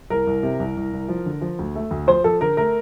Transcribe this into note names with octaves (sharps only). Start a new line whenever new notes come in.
C2 A#4
C2
C3
C2
C2
C2
F3
D3
F3
D2
A3
D2
F3 C5
F3 A4
D3 A#4
A3 A#4